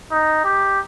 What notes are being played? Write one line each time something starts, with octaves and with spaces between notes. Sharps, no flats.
D#4
G4